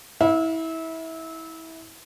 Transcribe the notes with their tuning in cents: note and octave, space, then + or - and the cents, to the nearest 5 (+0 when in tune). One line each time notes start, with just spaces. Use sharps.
E4 -25 F5 +30